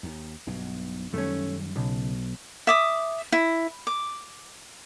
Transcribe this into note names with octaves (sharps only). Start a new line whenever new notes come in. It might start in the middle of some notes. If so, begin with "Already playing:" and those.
D#2
B1 G2 B2
F#2 D#3 G3 A3 C#4
B1 C#3
E5 D6 D#6
E4
D6